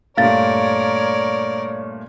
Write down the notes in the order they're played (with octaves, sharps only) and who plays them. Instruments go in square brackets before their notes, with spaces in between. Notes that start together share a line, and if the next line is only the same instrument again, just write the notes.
[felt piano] G2 A#2 A3 [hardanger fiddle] A#4 D5 [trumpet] C#5 [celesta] F5 A6